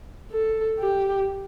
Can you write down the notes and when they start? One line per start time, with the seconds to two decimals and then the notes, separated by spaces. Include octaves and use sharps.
0.31 A4
0.80 G4